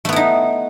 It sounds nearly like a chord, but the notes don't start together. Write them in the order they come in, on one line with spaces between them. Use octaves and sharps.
A3 B3 E4 D#4